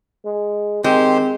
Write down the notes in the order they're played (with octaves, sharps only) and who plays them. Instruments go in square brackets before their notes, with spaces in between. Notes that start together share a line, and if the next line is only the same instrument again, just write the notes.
[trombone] G#3
[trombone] D#3 [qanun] G#3 [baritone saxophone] C4 [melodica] G4 C5